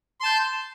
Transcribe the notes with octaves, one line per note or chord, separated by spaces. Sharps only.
A5 C6 G6